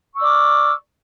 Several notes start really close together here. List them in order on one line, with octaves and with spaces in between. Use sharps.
C#6 E6 D5 D6 F6